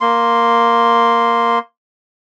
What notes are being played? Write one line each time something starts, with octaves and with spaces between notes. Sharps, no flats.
A#3 C6